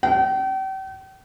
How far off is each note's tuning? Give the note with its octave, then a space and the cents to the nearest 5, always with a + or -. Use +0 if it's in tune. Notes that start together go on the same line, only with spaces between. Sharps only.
G5 -40